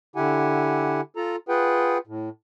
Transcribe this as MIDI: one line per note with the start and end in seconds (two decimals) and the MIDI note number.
0.16 1.01 50
0.16 1.01 64
0.16 1.01 67
0.16 1.01 78
0.16 1.01 80
1.17 1.36 65
1.17 1.36 69
1.17 1.36 82
1.49 1.98 65
1.49 1.98 68
1.49 1.98 71
1.49 1.98 78
1.49 1.98 79
2.07 2.29 45